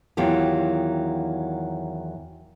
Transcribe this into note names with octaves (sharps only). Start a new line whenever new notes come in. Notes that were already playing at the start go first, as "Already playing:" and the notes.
E2 D#3 F#3 F4 G4